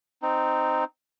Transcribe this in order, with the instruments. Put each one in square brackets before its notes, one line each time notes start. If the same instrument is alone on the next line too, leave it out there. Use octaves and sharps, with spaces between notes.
[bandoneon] C4 D#4